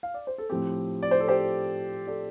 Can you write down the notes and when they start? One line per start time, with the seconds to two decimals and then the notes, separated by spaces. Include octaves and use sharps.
0.03 F5
0.14 D5
0.27 C5
0.38 A4
0.50 A2 F3 C4 G4
1.02 D5
1.11 C5
1.20 A4
1.28 G4 C5
2.07 A4 D5